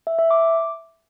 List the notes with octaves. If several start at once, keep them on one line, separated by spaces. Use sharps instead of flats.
E5
E5
D6